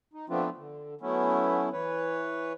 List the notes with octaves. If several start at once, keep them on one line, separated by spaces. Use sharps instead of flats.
D#4
F3 A3 B3 C4 D4 F4
D3
F#3 A3 B3 C#4 E4
E3 B4 C#5